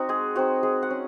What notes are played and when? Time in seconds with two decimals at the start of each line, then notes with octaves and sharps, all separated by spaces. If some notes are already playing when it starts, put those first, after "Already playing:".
Already playing: C4 D#4 F#4
0.09 G#3 G#4
0.36 C4 D#4 F#4
0.63 G#3 G#4
0.82 F#5
0.90 C#4